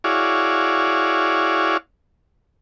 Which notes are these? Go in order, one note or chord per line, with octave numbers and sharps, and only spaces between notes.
E4 F#4 G#4 C#5 D5 F5